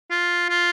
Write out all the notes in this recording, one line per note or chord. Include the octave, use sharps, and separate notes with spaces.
F4
F4